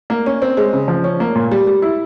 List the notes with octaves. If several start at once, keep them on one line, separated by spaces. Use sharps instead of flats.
A#3
C#4
C4
G#3
C#3
F3
C#4
A#3
A#2
G3
G3
E4